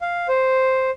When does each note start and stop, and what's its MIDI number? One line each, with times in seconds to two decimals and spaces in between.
0.02 0.27 77
0.28 0.90 72